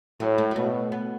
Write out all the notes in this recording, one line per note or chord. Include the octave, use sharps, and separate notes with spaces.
A2 F#3
A3
F#3
B2 A3
B3